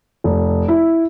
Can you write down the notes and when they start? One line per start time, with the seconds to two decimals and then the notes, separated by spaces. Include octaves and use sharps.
0.24 F1
0.68 E4